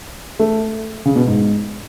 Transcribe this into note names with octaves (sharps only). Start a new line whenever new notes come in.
A3
C#3
B2
G#2